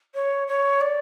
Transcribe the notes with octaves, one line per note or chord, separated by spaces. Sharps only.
C#5
C#5
D5